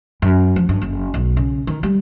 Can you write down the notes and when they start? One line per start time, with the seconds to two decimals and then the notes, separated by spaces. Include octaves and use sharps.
0.22 F#2
0.56 F3
0.69 G2
0.82 F#1
1.14 B1
1.37 C#3
1.67 D#3
1.83 G3